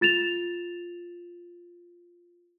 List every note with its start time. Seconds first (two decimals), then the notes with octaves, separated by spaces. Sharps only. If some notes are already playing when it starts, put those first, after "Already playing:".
0.01 F4 A6 E7 F7